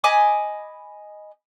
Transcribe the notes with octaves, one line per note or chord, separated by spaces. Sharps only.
D#5 G#5 B5 D6